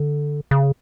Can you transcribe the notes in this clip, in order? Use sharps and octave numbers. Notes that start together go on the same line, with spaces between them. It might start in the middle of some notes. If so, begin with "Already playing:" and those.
Already playing: D3
C#3